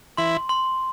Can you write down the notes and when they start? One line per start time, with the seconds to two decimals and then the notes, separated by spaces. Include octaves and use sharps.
0.17 E3 E4 C6
0.49 C6